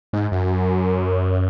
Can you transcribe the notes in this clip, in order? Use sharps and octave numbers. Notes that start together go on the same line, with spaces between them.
G#2
F#2